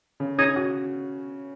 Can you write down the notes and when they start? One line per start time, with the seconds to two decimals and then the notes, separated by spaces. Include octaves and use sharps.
0.20 C#3
0.38 C#4 D#4 G#4
0.56 F#4